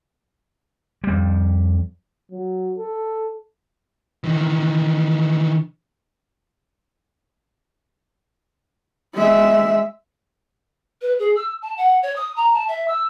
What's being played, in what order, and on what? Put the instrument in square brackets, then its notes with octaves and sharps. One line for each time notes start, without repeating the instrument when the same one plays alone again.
[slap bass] F2 G3
[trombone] F#3
A4
[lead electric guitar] D#3 E3
[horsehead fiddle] G#3 E5
[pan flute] B4
G#4
E6
A5
F#5
C#5
D#6
A#5
A5
E5
E6